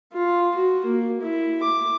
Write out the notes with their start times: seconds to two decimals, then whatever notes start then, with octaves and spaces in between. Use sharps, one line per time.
0.13 F4
0.55 F#4
0.85 A#3
1.21 E4
1.63 D6